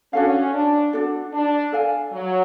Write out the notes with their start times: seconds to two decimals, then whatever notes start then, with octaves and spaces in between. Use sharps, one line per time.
0.13 C#4 D4 F#4 A4 F5
0.54 D4
0.93 D4 F#4 A4
1.33 D4
1.72 A4 F5 G#5
2.13 F#3